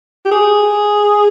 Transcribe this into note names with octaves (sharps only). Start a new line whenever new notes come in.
G4
G#4